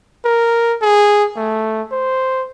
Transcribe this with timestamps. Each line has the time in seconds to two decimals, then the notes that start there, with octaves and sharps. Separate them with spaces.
0.25 A#4
0.81 G#4
1.36 A3
1.92 C5